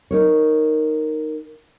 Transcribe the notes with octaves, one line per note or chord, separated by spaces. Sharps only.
D#4 A#4 C#5